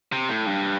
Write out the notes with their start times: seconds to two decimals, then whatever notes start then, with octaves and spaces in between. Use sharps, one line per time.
0.12 C3
0.29 A2
0.47 G2